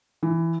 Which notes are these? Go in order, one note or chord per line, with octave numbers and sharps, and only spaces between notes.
E3